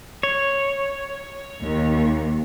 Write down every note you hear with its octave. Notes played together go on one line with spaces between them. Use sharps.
C#5
D#2